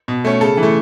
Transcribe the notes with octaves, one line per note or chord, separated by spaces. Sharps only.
B2
A3 C#4
C#3 A4
E3
A3